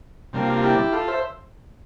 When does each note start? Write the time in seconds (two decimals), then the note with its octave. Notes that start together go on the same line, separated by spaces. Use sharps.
0.33 C3 G3 A#3 D4
0.43 F4
0.53 F4
0.63 E4 G4
0.92 F4 A4
1.08 C5 E5